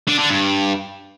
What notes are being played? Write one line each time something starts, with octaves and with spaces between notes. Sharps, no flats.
D3
D3
G2